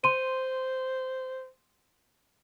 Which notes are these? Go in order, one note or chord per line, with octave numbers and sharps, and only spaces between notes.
C5 C6 D#7